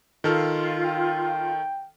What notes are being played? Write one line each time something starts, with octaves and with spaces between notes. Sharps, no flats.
D#3 F4 A4 F6
G5